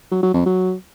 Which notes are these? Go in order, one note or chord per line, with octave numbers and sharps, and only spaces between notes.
F#3
F#3
F2
F#3